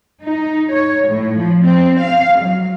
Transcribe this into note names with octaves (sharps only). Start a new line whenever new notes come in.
D#4
C#5
A2
F3
C4
F5
F#3